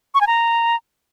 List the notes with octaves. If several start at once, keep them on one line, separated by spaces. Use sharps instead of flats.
C#6
G#5
A#5